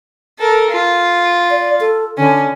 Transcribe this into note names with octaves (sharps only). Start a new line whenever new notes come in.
A4 A#4
F4
D5
A4
D3 C#4